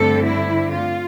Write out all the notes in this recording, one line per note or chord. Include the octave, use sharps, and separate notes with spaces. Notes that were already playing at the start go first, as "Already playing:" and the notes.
Already playing: G2 D3 A3 C4 A4
E4
F4